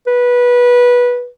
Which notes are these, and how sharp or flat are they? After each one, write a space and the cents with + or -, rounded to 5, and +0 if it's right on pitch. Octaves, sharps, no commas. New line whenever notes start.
B4 -15